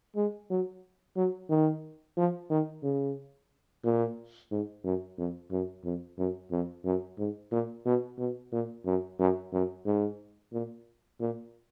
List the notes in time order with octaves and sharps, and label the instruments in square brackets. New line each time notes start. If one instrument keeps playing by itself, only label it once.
[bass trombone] G#3
F#3
F#3
D#3
F3
D#3
C#3
A#2
G#2
F#2
F2
F#2
F2
F#2
F2
F#2
G#2
A#2
B2
B2
A#2
F#2
F#2
F#2
G#2
A#2
A#2